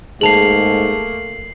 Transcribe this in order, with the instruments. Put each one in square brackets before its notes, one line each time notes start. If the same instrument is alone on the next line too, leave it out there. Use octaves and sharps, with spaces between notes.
[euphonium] G#2 [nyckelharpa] A3 A#3 [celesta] G#4 A5 [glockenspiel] C7 F7 F#7